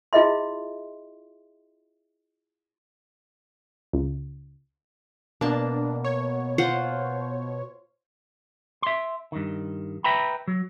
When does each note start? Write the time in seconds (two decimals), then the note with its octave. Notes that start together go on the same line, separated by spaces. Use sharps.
0.13 E4 F4 G#4 D#5 E5 C6
3.93 C#2
5.41 B2 A#3 D4 A5
6.04 C#5
6.58 F4 C5 F#5
8.82 E5 C6
9.32 G2 D#3
10.04 B4 E5 G5 A#5 B5
10.48 F#3